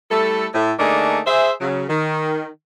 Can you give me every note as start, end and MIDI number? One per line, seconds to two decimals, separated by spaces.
0.11 0.46 55
0.11 0.46 57
0.11 0.46 64
0.11 0.46 69
0.54 0.72 45
0.79 1.20 50
0.79 1.20 57
0.79 1.20 58
0.79 1.20 62
0.79 1.20 63
0.79 1.20 68
1.27 1.52 68
1.27 1.52 72
1.27 1.52 76
1.61 1.84 49
1.61 1.84 54
1.89 2.47 51